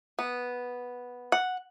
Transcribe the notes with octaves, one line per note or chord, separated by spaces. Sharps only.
B3
F#5